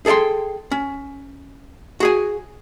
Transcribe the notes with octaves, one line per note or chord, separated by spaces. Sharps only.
G#4 A4 D#5 G5 C6
C#4
F#4 G#4 G#5